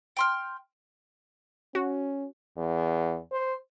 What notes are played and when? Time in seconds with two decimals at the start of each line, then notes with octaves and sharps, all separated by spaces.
0.17 G5 C6 F6
1.75 C#4 F#4
2.57 E2
3.32 C5